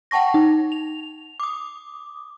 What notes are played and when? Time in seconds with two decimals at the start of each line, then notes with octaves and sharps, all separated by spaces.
0.11 F#5 G5 A5 C#6 A#6
0.34 D#4
0.72 F7
1.40 D6 D#6